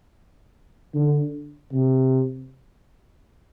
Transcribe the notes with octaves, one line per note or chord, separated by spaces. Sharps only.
D3
C3